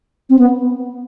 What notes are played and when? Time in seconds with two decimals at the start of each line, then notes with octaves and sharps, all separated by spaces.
0.30 C4
0.39 B3